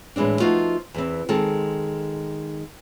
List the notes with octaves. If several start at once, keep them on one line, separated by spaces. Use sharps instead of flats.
A2 E3 G#3 C4 D4
F3 A3 B3 D#4 F4 F#4
E2 E3 C4
D#3 G#3 C4 A4